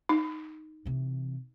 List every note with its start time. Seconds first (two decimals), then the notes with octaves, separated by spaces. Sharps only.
0.09 D#4
0.85 C3 E3